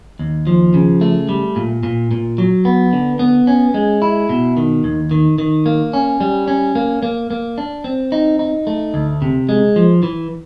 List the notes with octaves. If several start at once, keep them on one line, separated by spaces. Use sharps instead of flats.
D#2
F3
C#3
A3
G3
A#2
A#2
A#2
F#3
B3
D3
B3
C#4
G#3
E4
B2
D#3
D#2
D#3
D#3
A#3
C#4
G3
C#4
A#3
A#3
A#3
D4
C4
D#4
D#4
A3
D2
C3
G#3
F3
E3